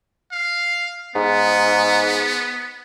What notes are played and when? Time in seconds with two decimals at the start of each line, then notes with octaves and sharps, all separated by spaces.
0.32 F5
1.15 G#2 B3